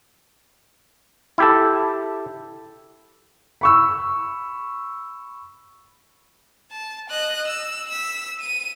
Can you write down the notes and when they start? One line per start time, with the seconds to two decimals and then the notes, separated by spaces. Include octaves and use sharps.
1.38 E4 G4 A4
3.61 B5 C#6 E6
6.71 A5
7.09 D#5 F#6
7.47 E6
7.89 E6 B6
8.40 D#7